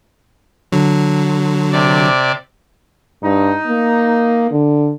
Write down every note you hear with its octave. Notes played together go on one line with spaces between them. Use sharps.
D3 F#3
C3 D5
G2 D#4
A#3
D3